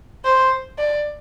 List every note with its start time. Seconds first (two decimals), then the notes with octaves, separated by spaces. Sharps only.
0.25 C5
0.78 D5